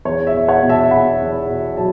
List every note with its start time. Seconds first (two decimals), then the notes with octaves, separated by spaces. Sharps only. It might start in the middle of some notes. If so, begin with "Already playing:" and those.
0.05 E2 C#5
0.27 E5
0.34 E2
0.48 C#5 F#5
0.63 B2
0.69 E5 A5
0.91 B2 F#5 B5
1.20 E2
1.49 B2
1.77 F#3 A5